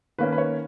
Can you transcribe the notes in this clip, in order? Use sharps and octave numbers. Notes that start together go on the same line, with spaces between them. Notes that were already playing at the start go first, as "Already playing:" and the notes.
D#3 A#3 C#4 B4
B4
C#5